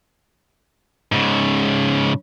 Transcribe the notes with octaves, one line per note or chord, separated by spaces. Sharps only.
G#2 C#3